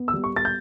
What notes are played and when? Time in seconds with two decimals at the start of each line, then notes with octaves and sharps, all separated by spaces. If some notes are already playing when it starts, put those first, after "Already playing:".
Already playing: B3
0.08 E6
0.13 G3
0.24 C#6
0.34 B3 A6
0.45 G6